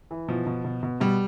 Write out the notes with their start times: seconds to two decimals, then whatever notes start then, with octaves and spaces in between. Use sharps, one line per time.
0.11 E3
0.28 B2 F3
0.47 B2
0.65 B2
0.83 B2
1.00 B2 G3